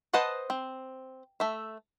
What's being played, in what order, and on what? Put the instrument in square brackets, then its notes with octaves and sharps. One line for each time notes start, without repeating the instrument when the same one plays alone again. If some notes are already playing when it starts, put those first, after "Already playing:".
[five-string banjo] B4 C5 D#5 F#5 A5
C4
A3 E5